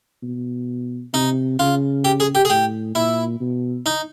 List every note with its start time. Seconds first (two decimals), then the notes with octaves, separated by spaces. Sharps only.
0.23 B2
1.14 C3 D#4
1.59 C#3 F4
2.05 G4
2.20 G#4
2.35 G4
2.45 G#4
2.50 A2 G4
2.95 A#2 E4
3.40 B2
3.86 D#4